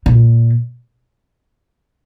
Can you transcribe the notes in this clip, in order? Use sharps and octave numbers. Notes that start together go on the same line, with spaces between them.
A#2